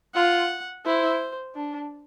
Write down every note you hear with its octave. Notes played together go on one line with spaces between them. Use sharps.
F4 F#5
E4 C5
D4